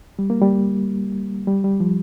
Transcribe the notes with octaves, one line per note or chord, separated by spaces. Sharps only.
G3
A#3
G3
G3
G3
F3